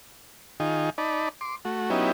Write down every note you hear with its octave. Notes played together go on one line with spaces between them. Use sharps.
D#3 D#4 F4 G#4
D#4 D5 A5 B5
C6 D6
A3 F#4
F#3 B3 C#4 D#4 E4 G4